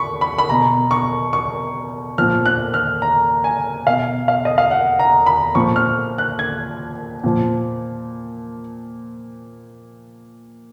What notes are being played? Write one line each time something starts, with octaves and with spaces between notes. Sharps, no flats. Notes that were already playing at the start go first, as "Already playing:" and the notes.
Already playing: B5 C#6
B5
B5
B2 A#5
C#6
C#6
A#2 F3 F6
F#6
F6
A#5
G#5
B2 F5
F5
D#5
F5
F#5
A#5
B5
A#2 F3 C#6
F6
F#6
G#6
A#2 F3